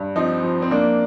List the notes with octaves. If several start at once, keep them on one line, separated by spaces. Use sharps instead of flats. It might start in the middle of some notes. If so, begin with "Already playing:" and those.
Already playing: G2
F3 C4 D#4
F3
C4
F3 A#3 D4